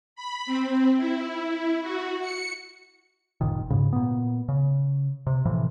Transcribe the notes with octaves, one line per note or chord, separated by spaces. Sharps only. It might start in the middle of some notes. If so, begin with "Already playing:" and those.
B5
C4
E4
E4
F#4
C#7
F#1 A#2 D#3
G#2 C#3
A#2 B3
C#3
C3
A2 C3 E3 F3